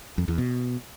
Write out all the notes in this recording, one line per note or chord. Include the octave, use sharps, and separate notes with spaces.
F2
E2
B2